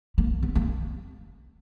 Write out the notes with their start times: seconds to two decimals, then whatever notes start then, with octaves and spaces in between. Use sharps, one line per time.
0.18 A#3
0.43 B3
0.55 A#3